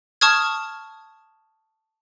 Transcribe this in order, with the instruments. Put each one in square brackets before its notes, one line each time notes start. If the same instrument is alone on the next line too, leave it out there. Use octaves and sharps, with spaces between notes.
[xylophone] A5 C#6 D#6 F6 G#6